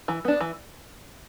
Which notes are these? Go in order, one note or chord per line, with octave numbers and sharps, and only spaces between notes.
E3
B3 D4
E3